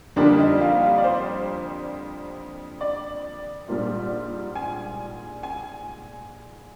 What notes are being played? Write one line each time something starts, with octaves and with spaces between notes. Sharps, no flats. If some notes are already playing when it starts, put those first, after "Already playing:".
F2 D3 G3 A#3 D4
D#4
F4
F4
D5
C5
D5
A#1 G#2 G3 A#3 F4
G#5
G#5